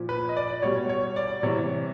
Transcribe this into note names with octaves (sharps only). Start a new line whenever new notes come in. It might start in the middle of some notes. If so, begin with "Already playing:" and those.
Already playing: A#2 F3
B4
D#5
D5
B2 G3 C#5
C#5
D5
C3 E3 G3 C#5